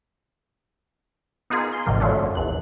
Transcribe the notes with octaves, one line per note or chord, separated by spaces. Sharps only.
B3 D#4 F4 G#4 A#4
C6
A1 G#2 C3 F3 A#4
D3 F3 F#3 A3 C#4 D4
F#2
A#1 E2 F#6